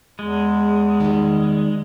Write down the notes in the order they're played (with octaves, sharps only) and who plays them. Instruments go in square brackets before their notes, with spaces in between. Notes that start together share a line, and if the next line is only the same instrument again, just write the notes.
[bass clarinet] E2 [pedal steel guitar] G#3
[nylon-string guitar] D#3 G3